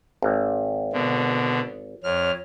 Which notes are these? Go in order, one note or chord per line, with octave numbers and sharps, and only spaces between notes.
G#1
B2 D3
F2 C#5 F6